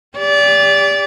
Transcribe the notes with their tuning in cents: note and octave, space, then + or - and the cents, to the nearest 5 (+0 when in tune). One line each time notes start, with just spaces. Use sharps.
G4 +35 D5 -25